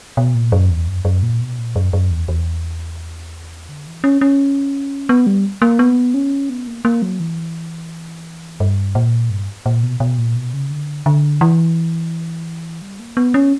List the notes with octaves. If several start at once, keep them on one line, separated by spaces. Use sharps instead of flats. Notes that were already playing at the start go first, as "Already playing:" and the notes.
B2
A#2
F#2
E2
F#2
F#2
A#2
B2
A#2
F#2
F#2
E2
E2
D3
E3
C#4
C#4
B3
G3
A#3
B3
C#4
B3
A#3
A#3
F#3
E3
G2
A#2
G2
A#2
B2
B2
A#2
B2
C#3
D3
D3
E3
G3
A#3
B3
C#4